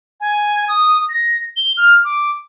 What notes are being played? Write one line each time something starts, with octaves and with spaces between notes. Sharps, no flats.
G#5
D#6
A#6
G7
F6
D6